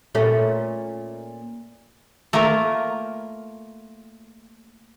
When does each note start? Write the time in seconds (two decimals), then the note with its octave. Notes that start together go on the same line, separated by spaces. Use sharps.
0.15 A#2 A3 C#4
2.33 A3 A#3 F4 A#4